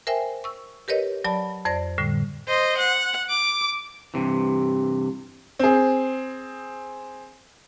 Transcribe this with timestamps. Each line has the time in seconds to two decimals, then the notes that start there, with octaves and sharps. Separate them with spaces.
0.07 A#4 C5 E5 G5 G#5
0.44 C#6 E6
0.88 G4 A#4 B4 C#5 D#5
1.24 F#3 D5 A5 B5
1.65 F2 C5 D5 A#6
1.98 A2 D3 G3
2.48 C5 D#5
2.78 F#5
3.29 D6
4.14 G2 C3 E3
5.59 C4 G#4